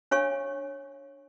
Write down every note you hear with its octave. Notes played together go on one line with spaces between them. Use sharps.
D4 C#5 F5 G#5 C#6